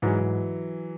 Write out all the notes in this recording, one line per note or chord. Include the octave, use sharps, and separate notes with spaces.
G#2 E3 F#3
G#2